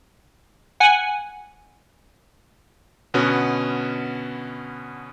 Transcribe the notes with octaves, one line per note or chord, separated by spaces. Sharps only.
F#5 G#5
B2 D3 B3 C#4 F#4